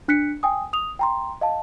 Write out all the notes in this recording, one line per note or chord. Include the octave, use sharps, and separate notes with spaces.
D4 F#6 B6 C#7
G5 G#5 D#6
D#6 F7
G5 A#5 C6
D#5 F5 A5